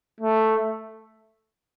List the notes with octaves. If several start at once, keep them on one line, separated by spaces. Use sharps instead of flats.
A3